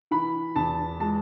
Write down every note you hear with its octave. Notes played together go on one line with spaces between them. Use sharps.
E3 B5
E2 A5
G#3 A5